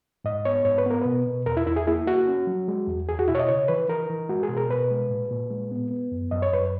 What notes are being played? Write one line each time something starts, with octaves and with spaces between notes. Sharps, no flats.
G#2 D#5
B3 C#5
G#2 C#5
B4
B3 A#4
B2 B4
B2
E2 A#4
E4
E2 E4
G#4
A#3 E4
A#3 F#4
C#4
F#3
G#3
E2
E2 G#4
F#4
B2 E4
C#5
D#5
C#3 C#5
E3 B4
E3 A#4
E3
G#3 F#4
G#4
B2
A#4
B2 B4
G#3
A#2
A#2
G#3
B3
B3
F#2
F#2 D#5
C#5
F#2 B4